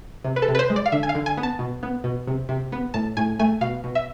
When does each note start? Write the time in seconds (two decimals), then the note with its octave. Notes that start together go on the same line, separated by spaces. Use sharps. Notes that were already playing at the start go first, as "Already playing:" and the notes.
0.24 C3
0.36 B4
0.42 A4
0.48 C3
0.55 B4
0.59 C5
0.70 G#3
0.76 D5
0.86 F5
0.92 D3 E5
1.03 G#5
1.09 F5
1.15 D3
1.26 G#5
1.37 B3
1.43 A5
1.59 B2
1.83 B3
2.04 B2
2.27 C3
2.49 C3
2.72 B3
2.94 A2 A5
3.17 A2 G#5
3.39 A3 G#5
3.61 B2 F5
3.84 B2
3.95 E5